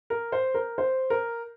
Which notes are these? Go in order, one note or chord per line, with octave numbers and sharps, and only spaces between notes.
A#4
C5
A#4
C5
A#4